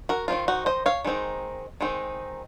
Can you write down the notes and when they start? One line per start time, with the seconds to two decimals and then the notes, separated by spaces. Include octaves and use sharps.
0.09 F#4 A#4
0.28 D#3 G#3 C4 D#4 F4
0.48 D#4 F#4
0.66 C5 D#5
0.86 C#5 F5
1.05 D#3 G#3 C4 D#4
1.81 D#3 G#3 C4 D#4